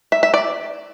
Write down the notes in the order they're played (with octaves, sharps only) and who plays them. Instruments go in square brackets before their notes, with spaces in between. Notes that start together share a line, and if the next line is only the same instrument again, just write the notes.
[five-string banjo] E5
E5
D5